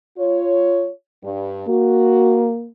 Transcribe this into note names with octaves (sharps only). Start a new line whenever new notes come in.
F4 C#5
G2
A#3 F#4